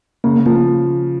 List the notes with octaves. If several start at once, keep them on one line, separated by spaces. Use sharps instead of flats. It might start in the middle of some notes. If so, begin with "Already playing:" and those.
C#3 A#3
F3 A#3